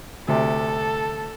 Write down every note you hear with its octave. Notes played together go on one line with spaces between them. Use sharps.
D2 C3 A4